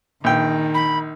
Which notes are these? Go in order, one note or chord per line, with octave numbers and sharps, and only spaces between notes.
A#1 D#3 G5
B5